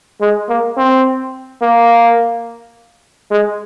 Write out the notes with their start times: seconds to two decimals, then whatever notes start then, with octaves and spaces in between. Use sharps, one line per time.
0.21 G#3
0.49 A#3
0.77 C4
1.62 A#3
3.31 G#3